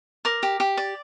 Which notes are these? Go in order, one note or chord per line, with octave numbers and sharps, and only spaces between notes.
A#4 D6
G4
G4
D5